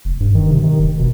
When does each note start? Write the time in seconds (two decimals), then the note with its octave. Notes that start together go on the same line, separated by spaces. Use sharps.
0.05 F1
0.20 G2
0.35 D#3
0.51 C3
0.63 D#3
0.79 F1
0.99 B2